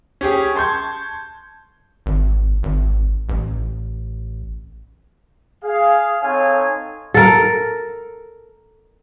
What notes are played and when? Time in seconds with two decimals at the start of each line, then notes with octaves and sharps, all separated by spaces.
0.21 C#4 G4 G#4
0.56 A5 C6 C#6 G6 G#6
2.06 G#1
2.63 G#1
3.29 A1
5.63 G#4 F5
6.22 C4 D#4 A4 C#5 F5 G#5
7.14 A4 A#4